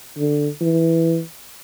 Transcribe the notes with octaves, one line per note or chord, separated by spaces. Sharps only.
D3
E3